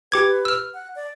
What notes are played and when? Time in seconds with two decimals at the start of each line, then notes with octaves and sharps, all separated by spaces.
0.12 G4 B4 D6 G#6
0.45 E6 F6
0.74 F#5
0.96 D5